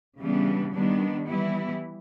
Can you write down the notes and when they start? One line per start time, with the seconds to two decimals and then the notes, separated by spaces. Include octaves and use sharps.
0.22 C#3 E3 G3 B3 D4
0.74 D#3 G3 B3 D4
1.28 E3 G3 B3 E4